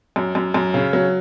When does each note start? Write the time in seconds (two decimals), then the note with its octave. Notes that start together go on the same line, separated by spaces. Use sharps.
0.16 F#2
0.35 F#2
0.54 F#2
0.74 C#3
0.93 F#3